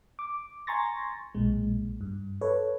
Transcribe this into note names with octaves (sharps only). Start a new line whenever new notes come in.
D6
G#5 A#5 C6 C#6 A6 A#6
B1 A#2 G#3
G2
A4 B4 C#5